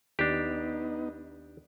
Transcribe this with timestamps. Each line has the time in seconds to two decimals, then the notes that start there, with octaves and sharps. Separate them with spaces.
0.19 D#2 B3 D4 D#4 G4